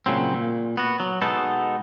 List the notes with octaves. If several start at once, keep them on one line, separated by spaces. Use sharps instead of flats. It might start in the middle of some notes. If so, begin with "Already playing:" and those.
A#2 C#3 F#3 C4
A#2
B3 F#4
F#3
B2 G#3 B3 D#4 A4